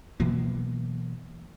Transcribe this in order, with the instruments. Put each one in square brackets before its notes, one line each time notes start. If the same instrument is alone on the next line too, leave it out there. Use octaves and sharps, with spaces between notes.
[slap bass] B2 E3 F#3 A#3